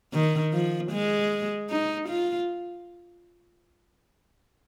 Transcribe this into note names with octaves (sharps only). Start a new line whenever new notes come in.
D#3
F3
G#3
D#4
F4